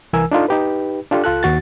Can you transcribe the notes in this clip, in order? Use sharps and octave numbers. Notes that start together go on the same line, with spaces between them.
C2 E3 A#4 G#5 E6
D4 D#4 F4 A4
D#4 G4 B4
D4 F4 G4 A4
C#2 F4 A4 F#6
D#2 F#4 A6